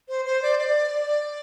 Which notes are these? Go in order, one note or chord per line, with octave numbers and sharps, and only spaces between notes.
C5
C5
D5
D5